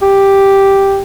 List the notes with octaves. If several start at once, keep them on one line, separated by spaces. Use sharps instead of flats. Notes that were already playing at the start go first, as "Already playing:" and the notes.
G4